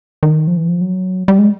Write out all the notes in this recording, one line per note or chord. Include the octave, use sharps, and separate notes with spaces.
D#3
F3
E3
F3
F#3
G3
G#3